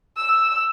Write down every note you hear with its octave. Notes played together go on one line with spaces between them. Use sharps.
E6